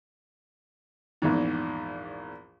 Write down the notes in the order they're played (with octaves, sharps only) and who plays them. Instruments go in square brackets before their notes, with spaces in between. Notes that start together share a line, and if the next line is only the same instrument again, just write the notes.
[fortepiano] A#1 E2 G#2